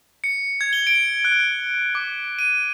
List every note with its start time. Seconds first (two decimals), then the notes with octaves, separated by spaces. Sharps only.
0.24 C#7
0.61 G#6
0.73 G7
0.87 D7
1.25 F#6
1.95 D6
2.39 D#7